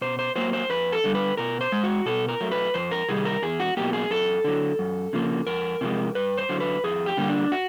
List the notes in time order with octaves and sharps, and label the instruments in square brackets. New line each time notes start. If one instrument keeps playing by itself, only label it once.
[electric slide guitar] B2 C5
C5
F#3 A#3 C5
C5
F2 B4
A4
D3 G3
B4
B2 A#4
C5
G#3
F#4
B2 A4
A#4
F#3 A3
B4
F2 C5
A#4
C3 D#3 G3 G#4
A#4
E2 G#4
F#4
B2 F#3 A#3 G4
G#4
F#2 A4
D3 F#3
F#2
C#3 F3 A#3
F2 A#4
C3 F3 G#3
G2 B4
C5
D3 F#3
B4
F2 G#4
G4
D3 G3 A#3
D4
F#4